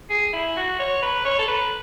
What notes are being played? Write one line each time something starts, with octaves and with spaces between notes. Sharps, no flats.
G#4
E4
F#4
C#5
B4
C#5
A4
B4